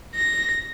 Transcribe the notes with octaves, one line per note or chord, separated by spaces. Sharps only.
A#6